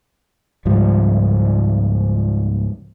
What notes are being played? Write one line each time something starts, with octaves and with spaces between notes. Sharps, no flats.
C#2 G#2 F3 G3